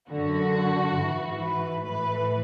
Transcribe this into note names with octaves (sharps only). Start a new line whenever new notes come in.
F#2 D3 F#4
G#2 E3
B4
A2 E3 B4